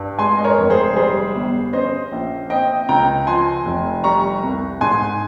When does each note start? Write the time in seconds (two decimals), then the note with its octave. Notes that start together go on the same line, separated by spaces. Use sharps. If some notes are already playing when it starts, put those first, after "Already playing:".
Already playing: G2
0.19 G#3 G#5 C6
0.37 D#5
0.44 A#4 C#5
0.58 F1
0.70 G#4 C5
0.96 G3 G#4 C5
1.35 G1
1.73 C#4 C5 D#5
2.12 A#1
2.50 C4 D#5 G5
2.89 C#2 G5 A#5
3.27 F3 G#5 C6
3.65 F1
4.04 G3 A#5 C#6
4.43 C2
4.81 G#2 G#5 C6